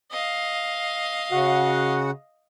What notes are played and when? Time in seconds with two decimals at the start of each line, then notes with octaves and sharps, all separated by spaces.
0.11 D#5 F5
1.32 C#3 F#4 F#5